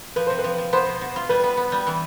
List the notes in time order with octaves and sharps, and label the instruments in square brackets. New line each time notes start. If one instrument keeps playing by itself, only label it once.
[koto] F3 [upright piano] B4
[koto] C3 [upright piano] C5
[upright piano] B4
[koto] F3
F3
[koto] B3 [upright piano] C5
[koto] B2
B2
F4
[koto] G3 [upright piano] B4
[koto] B3
B3
G3
E3